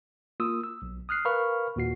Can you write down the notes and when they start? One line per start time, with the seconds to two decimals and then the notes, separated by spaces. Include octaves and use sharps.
0.40 A#3 F4 D#6 E6
0.64 E6
0.82 B1
1.09 D#6 F6 F#6 C7
1.25 A#4 B4 F5 B5 C#6 F6
1.76 D#2 A#2 F#4 C7